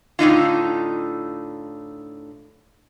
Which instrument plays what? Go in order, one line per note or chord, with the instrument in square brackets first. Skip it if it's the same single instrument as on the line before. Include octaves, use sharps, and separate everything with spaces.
[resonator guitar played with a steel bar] A2 D3 D#4 F4